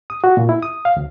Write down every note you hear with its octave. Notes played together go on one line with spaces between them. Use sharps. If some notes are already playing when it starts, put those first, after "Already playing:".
D#6
F#4
A#2
E4
D#6
F5
D2